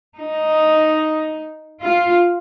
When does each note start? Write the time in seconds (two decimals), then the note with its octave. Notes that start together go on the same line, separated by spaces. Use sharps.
0.18 D#4
1.84 F4